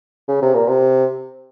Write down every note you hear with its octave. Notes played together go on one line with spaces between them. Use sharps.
C#3
C3
A#2
C3